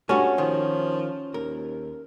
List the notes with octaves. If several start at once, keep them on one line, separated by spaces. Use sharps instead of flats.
G2 A3 C#4 F#4
D#3 F3
D#2 A#4